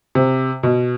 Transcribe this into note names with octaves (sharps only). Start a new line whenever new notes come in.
C3
B2